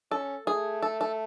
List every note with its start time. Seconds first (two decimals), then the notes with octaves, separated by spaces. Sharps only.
0.11 C#4 A4
0.47 A3 G#4
0.82 A4
1.01 A4